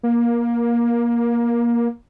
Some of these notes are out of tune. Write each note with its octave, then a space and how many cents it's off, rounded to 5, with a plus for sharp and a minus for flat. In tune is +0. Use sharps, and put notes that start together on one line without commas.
A#3 +20